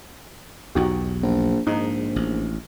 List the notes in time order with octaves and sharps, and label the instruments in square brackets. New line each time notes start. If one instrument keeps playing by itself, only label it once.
[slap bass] B1 E2 [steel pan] D#4 F#4 G4
[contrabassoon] A#1
[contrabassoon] A#1 [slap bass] G#2 [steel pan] D#4
[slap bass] A1